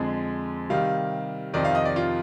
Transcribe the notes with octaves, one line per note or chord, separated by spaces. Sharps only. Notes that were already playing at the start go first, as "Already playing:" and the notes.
Already playing: F2 D3 G#3
C3 D#3 G3 F5
F2 C3 D#3 D5
F5
D#5
D5
F4